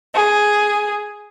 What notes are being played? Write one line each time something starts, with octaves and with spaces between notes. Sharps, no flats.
G#4